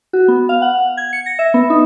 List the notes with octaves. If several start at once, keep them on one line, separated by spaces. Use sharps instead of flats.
F#4
B3
F5
F#5
G#6
C#7
A#6
E5
B3
D#4